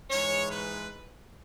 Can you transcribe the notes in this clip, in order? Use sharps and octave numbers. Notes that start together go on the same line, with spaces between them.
G#2 E3 G#3 C#5
B4